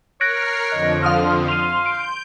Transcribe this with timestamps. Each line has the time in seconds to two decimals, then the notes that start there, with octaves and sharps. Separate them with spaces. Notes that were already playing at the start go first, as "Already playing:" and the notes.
0.21 A#4 C#5 F6 F#6 A#6 C7 D7
0.72 F2 D3 F3 D#5
1.03 F5 C6 D#6 F6
1.48 F5 C6 D#7 F7
1.86 G6 D7